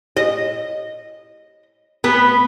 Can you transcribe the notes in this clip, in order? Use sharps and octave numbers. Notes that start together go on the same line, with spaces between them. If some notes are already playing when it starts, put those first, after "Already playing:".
D#5
B3